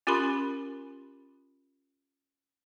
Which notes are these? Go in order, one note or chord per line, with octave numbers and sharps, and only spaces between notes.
C#4 F4 G4 A#4 B5 C6